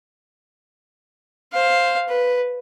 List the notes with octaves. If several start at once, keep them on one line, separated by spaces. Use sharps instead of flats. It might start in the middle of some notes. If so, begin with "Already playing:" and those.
C5 F5
B4